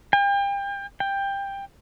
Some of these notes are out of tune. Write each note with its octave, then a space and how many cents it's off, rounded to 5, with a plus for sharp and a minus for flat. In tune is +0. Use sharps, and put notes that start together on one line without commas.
G5 +35
G5 +15